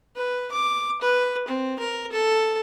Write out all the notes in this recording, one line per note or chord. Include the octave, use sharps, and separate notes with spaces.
B4
D6
B4
C4
A#4
A4